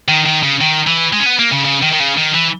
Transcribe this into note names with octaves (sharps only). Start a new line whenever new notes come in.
D#3
D#3
C#3
D#3
E3
G#3
C#4
B3
A#3
C#3
C#3
D#3
D#3
C#3
D#3
E3